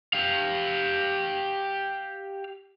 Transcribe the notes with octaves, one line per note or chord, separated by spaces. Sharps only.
G4 F5